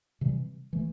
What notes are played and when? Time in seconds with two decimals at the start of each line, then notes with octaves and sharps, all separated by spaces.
0.21 C3 E3 G3
0.73 E3 A3